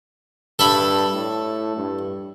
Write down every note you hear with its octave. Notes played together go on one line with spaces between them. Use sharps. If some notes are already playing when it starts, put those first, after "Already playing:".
G2 A4 E5 B5
A2
G2